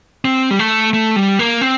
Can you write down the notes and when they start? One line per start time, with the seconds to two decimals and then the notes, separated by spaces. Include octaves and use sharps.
0.25 C4
0.51 G3
0.59 A3
0.93 A3
1.16 G3
1.39 A#3
1.61 C4